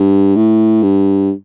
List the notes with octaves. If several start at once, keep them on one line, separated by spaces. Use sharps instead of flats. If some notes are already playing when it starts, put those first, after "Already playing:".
Already playing: G2
A2
G2